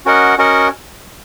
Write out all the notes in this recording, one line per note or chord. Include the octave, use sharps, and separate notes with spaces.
C#4 F#4 A#4 D#5 F#5
C#4 F#4 A#4 D#5 F#5